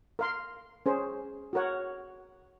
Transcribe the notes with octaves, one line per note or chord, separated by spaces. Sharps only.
A#4 F5 C6
C#4 G#4 C5
F#4 A#4 C#5 F#5